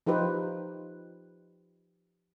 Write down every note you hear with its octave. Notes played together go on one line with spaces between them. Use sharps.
F3 D#4 F4 G4 B4 C5